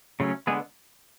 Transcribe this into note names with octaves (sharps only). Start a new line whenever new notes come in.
C#3 F#3 A3 C#4
D3 G#3 B3 G#4